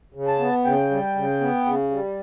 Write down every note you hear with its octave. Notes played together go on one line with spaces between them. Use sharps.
C#3
A5
B3
C#3 G5
G3
C#3
B3
C#3
G3